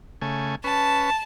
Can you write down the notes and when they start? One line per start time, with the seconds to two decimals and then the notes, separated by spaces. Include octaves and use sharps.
0.22 C#3 A3 G#5
0.64 C#4 B4 A5